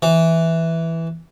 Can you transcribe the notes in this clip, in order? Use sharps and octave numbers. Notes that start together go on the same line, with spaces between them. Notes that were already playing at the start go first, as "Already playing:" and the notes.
E3